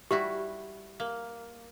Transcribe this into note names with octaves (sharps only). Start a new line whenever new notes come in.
G3 E4 F#4 G4
A#3